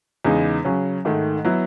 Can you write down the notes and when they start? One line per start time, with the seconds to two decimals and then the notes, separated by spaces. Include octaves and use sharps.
0.25 E2 C#3 G#3 D#4
0.64 C#3 F#3 C#4
1.05 G#2 D#3 A3
1.44 F#3 B3 E4